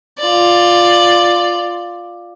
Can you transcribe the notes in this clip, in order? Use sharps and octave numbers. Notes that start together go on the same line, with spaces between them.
F4 D5